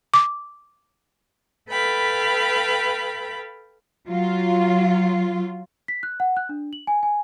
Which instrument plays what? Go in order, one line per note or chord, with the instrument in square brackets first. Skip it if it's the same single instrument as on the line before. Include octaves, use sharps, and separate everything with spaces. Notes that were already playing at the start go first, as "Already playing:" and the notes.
[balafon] D6
[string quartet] A4 B4 F5 G5 B5
[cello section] F#3 F4
[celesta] B6
F#6
F#5
F#6
D4
F#7
G#5
G#5